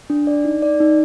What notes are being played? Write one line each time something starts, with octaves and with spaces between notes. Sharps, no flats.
D4
D5
D#4
D5
D#4